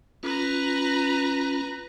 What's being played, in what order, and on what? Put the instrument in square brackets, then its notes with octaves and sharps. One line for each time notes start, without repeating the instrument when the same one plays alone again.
[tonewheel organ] C#4 F4 [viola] B4 A#5